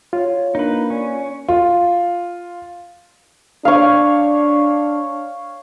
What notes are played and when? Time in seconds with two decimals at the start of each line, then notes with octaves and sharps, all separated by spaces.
0.13 F4 C#5
0.55 A#3 D4 D#4 B4
0.90 C#4 D5
1.49 F4
3.65 D4 C#5 F5